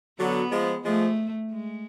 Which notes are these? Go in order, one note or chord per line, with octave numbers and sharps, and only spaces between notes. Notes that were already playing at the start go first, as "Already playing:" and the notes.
D3 F#3 B3
F3 G#3
F3 G#3 A3
G#3